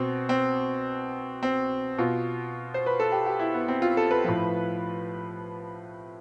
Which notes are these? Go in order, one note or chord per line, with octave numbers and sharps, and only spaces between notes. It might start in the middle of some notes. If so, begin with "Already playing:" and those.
Already playing: B2 C4
C4
C4
B2 F4
C5
B4
A4
G4
G4
E4
B3
C4
F4
A4
B4
A2 F3